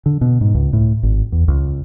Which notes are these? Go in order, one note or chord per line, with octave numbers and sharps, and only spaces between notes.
D3
B2
G#2
C#2
A2
G#1
E2
C#2